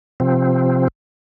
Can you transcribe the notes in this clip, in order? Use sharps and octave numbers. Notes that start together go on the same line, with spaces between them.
C3 F3 C4